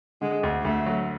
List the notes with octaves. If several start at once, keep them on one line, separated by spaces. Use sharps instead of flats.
D3 G#3
D2
D2 A3
F#3